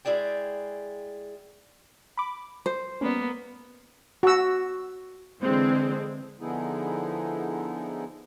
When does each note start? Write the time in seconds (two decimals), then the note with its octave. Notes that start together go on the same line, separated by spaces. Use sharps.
0.05 G#3 E4 G#4 D5 G5
2.17 B5 D6
2.66 C5
3.01 G3 A#3 B3 C#4
4.23 F#4 E6
5.41 D3 E3 G#3 C4
6.40 D3 F3 B3 D#4 E4 G#4